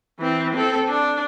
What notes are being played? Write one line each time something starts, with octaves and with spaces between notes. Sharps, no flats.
E3 C4
C4 A4
D4